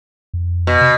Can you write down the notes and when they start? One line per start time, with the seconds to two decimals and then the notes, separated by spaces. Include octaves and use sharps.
0.34 F2
0.67 B2
0.81 C3